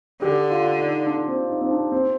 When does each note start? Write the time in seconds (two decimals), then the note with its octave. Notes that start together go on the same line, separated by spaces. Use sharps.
0.22 D3 G4
0.50 F4
0.79 D#4
1.07 D4
1.28 C4
1.50 D#4
1.61 C4
1.71 D4
1.92 C4